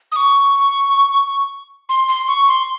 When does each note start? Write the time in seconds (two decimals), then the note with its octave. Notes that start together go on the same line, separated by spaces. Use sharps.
0.12 D#6
0.16 C#6
1.89 C6
2.08 C6
2.28 C#6
2.48 C6